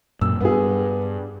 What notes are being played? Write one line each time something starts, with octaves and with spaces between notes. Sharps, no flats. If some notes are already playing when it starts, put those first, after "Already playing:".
F#2 A#2 E6
G2 G3 B3 G#4